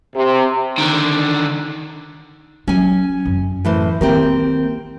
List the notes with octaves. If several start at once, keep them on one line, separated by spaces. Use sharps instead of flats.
C3
D3 D#3
F#3 C#4 G#5
F#2
A2 E3 C5
D#3 A#3 C4 G4 A#4